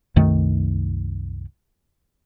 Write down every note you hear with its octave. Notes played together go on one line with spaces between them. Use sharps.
C2 F#2 D#3 A3